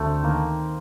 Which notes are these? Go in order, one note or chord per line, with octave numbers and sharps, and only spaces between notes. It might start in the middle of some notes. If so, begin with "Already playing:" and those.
Already playing: D2 A3 C4
D#3 A#3